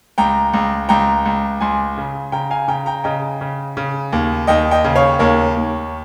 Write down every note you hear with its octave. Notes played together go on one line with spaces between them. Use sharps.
C#2 G5 A#5
C#2
C#2 G5 A#5
C#2
C#2 G#5 C6
C#3
C#3 G5 A#5
F5 G#5
C#3 G5 A#5
G5 A#5
C#3 D#5 G5
C#3
C#3
D#2
D#2 D#5 G5
D#5 G5
C#3
C#5 F5
D#2 A#4 C#5
D#2